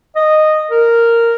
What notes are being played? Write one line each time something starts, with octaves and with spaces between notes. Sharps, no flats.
D#5
A#4